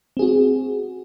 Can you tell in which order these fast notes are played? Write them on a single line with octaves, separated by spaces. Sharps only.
C4 G#4 F#4